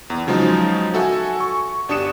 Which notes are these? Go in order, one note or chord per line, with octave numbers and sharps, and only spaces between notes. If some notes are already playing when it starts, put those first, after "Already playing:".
E2
C#3 F3 F#3 G#3 D#4
F#4 A4 E5 G#5
C#6
G1 D4 G4 D#6 C#7 E7